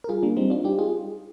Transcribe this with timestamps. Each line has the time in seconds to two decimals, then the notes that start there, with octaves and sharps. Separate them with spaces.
0.04 A#4
0.09 G3 F4 G#4
0.23 A#3 D4
0.37 G3 C4 D#4
0.50 D4 F4
0.64 G3 D#4 G4
0.79 F4 G#4